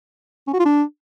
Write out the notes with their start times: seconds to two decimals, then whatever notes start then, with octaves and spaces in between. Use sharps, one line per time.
0.47 C#4
0.53 F#4
0.59 F4
0.65 D4